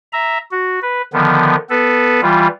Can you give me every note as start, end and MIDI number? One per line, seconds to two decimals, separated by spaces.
0.13 0.38 76
0.13 0.38 82
0.51 0.79 66
0.82 1.02 71
1.13 1.56 50
1.13 1.56 51
1.13 1.56 53
1.13 1.56 59
1.70 2.21 59
1.70 2.21 69
1.70 2.21 71
2.22 2.48 52
2.22 2.48 55
2.22 2.48 65